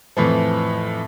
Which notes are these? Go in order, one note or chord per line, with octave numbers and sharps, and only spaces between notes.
F2 A2 E3 F3